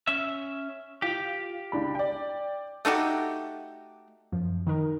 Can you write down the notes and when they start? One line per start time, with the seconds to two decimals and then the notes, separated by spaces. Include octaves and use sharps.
0.07 C#4 E5
1.02 F4 G4 F7
1.72 C#2 D4 B5
1.95 D5 G5
2.85 A3 D#4 F#4 G4
4.32 F#2 F3
4.67 D#3 D#4 A#4